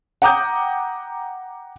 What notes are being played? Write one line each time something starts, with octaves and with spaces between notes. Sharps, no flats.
F#5 G5 A#5 D6 D#6 G6